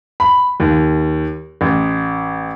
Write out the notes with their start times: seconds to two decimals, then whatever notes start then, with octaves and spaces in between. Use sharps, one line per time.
0.20 B5
0.60 D#2
1.61 A1